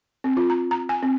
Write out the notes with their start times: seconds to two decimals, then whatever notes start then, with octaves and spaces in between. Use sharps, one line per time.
0.24 C4
0.37 F4
0.50 A#5
0.71 A#5
0.89 G#5
1.03 C4